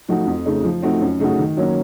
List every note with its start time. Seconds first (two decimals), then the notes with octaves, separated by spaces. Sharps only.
0.08 F3 A3 D#4 F#4
0.27 F2
0.46 C#3 A3 D#4
0.64 F3
0.82 A3 C4 D#4 F#4
1.01 F#2
1.20 C#3 A3 D#4 F#4
1.39 D#3
1.57 F#3 A#3 C#4